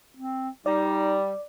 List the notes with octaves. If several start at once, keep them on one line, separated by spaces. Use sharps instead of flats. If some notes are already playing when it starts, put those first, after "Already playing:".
C4
G3 D#4 D5